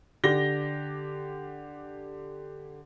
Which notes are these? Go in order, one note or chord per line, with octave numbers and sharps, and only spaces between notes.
D3 G4 A#6 G7